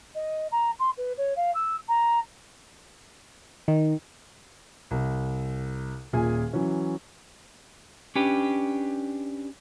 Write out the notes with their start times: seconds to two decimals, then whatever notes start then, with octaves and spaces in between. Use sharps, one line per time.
0.15 D#5
0.52 A#5
0.79 C6
0.97 B4
1.17 C#5
1.36 F5
1.54 E6
1.88 A#5
3.68 D#3
4.91 C2
6.13 D#1 A#2 G#4 G#5
6.53 E3 F#3 C#4
8.16 C#4 D4 G4 B4